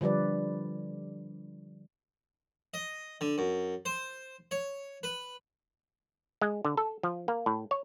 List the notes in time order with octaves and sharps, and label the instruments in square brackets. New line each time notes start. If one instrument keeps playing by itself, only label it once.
[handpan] D3 F3 G3 B4 D5
[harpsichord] D#5
D3
F#2
C5
C#5
B4
[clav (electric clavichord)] G#3
D3
A4
F3
A#3
A2
C#5